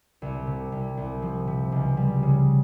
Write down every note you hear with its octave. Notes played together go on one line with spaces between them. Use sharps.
C2
C3
C2
C2
F3
C3
C#2
G3
C#3